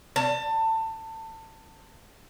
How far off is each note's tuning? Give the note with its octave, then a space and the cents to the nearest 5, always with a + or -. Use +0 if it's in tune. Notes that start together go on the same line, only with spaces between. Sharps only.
A5 +25